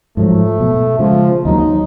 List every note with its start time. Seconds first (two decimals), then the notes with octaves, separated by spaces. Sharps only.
0.17 G#2 F3 F#3 A3
0.60 B2
0.99 C#3 F3 G#3
1.45 D#2 F#3 A#3 D#4